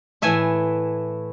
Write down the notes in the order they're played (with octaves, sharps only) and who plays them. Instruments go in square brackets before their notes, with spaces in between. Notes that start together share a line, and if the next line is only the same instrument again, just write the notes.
[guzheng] A2 E3 A3 E5 G#5